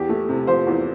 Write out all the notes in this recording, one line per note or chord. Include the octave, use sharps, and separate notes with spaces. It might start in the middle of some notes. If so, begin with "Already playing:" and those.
Already playing: E2 G4
A3
C3
F3 C5
E2